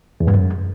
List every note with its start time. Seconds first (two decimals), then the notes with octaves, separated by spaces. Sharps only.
0.20 E2
0.27 G2
0.34 F#2